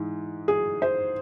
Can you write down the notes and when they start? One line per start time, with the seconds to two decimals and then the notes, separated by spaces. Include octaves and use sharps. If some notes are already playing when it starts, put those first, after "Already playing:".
Already playing: G#2 E3 G#3
0.48 G#4
0.82 C5